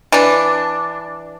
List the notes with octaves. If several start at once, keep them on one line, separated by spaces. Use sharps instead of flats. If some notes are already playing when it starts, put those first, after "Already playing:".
E3 D4